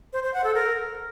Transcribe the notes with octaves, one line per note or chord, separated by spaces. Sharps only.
C5
C5
F#5
A4
A#4